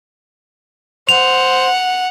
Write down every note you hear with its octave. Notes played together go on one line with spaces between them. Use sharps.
C5 F#5 F7